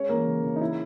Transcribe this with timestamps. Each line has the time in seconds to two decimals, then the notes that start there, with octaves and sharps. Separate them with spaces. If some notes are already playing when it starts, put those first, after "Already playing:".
Already playing: G#3 C#4 C#5
0.09 E3 A#3 A#4
0.27 C#3
0.43 C#3
0.56 D#4
0.61 E4